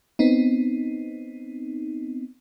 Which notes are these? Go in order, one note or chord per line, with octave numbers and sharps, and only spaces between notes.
B3 C4 D#4